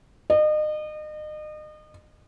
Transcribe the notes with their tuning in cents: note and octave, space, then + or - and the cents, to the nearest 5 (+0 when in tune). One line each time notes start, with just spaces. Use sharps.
D#5 -35